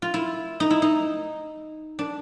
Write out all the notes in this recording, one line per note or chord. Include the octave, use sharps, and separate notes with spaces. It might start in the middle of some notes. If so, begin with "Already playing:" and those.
F4
E4
D#4
E4
D#4
D4